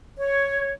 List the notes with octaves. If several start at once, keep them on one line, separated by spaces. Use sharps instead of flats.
C#5